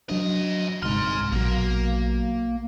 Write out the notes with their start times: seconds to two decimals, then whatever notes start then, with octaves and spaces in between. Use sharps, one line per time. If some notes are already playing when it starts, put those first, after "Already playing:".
0.10 F#2 F#3 D4 D#5
0.82 G1 C2 G#2 D#4 C6 F6
1.32 A#1 B2 F#3 A#3